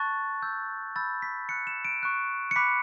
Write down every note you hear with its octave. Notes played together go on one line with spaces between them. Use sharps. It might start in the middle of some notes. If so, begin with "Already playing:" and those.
Already playing: A5 C#6 F#6 A6
C#6 E6 G6
B5 E6 G6 A6
B6
B5 F#6 C#7
E7
D7
C#6 F#6
C#7
B5 D6 F#6 B6